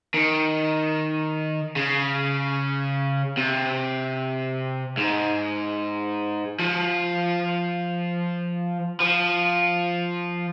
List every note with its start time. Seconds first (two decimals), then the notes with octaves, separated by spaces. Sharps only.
0.14 D#3
1.76 C#3
3.37 C3
4.97 G#2
6.60 F3
9.00 F3